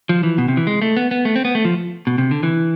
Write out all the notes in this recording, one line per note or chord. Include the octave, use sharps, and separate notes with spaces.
F3
E3
B2
C3
E3
G#3
A3
B3
B3
A3
C4
B3
A3
F3
B2
C3
D3
E3